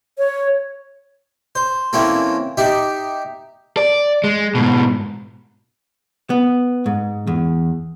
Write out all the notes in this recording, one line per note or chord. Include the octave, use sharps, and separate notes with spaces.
C#5
C5
E3 A#3 C4 C#4 A4
D#4 G4 E5
D5
G#3
G#2 B2
B3
G#2
E2